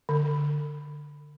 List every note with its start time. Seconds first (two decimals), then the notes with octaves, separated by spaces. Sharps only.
0.09 D3